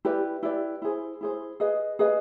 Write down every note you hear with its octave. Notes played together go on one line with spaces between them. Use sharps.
E4 G4 B4 D5
E4 G4 B4 D5
E4 G#4 C5
E4 G#4 C5
G#4 B4 D#5
G#4 B4 D#5